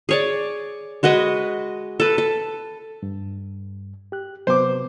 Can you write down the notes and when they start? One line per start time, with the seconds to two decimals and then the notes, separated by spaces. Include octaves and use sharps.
0.09 G#4 C#5 D5
1.03 G#3 F#4 B4 D#5
2.00 A4 B4
2.18 A4
3.03 G2
4.12 G4 F#6
4.47 C3 F#3 B3 C5 D6